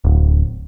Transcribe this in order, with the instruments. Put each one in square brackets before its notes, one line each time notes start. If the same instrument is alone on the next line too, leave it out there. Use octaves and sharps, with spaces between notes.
[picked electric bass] D1